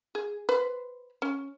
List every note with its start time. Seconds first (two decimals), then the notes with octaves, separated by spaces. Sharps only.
0.15 G#4
0.49 B4 C5
1.22 C#4